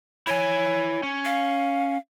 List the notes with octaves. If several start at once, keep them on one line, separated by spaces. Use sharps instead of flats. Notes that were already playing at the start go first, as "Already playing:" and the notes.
E4 C#5 G#5
C#4
F5